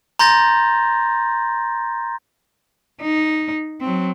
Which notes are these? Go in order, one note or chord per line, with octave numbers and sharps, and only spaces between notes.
A#5 C6 G6 A6 A#6
D#4
F#3 C4